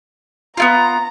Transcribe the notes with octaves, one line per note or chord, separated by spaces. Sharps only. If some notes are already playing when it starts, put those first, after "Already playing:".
B3 E4 F4 A#5